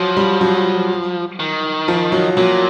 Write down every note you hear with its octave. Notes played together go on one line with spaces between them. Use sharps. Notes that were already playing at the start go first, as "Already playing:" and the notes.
Already playing: F3 F#3
G3
F#3
D#3
F3
F#3
A#2 F#3